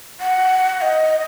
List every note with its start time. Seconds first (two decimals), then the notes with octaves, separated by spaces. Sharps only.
0.21 F#5
0.82 D#5